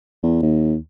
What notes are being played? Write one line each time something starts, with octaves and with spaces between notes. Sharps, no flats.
E2
D#2